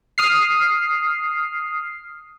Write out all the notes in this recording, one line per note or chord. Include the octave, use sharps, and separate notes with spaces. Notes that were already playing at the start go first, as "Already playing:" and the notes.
D#6 F6 C7